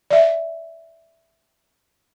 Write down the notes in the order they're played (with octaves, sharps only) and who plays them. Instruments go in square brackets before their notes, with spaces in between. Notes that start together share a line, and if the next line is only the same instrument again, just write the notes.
[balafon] D5 E5